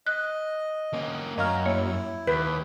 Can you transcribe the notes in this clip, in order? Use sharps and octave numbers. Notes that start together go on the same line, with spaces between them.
D#5 F#6
A#3 C#4
F#2 C#5 D#5 F5 A#5 F6
A#3 E4 C#5
D#2 B4